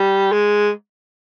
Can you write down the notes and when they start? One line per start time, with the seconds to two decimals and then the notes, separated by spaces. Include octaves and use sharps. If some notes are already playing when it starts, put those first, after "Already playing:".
Already playing: G3
0.32 G#3